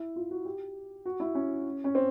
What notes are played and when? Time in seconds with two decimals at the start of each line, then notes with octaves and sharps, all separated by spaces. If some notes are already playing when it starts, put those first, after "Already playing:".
Already playing: E4
0.16 F4
0.31 F#4
0.45 G4
1.05 F#4
1.20 E4
1.35 C#4
1.84 C#4
1.95 C4